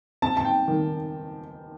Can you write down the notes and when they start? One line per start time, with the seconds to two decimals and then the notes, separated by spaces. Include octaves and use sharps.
0.22 C4 A5
0.37 A5
0.45 G5
0.68 D#3